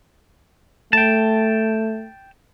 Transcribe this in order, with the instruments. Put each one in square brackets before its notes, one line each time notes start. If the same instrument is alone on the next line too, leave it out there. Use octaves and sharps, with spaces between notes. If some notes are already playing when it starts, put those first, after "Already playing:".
[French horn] A3 [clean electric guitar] G5 A5